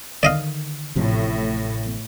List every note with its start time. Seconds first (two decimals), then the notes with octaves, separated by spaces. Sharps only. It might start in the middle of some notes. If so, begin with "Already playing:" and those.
0.23 D3 D#3 D5 D#5 F5
0.95 A1 A2 C3 F3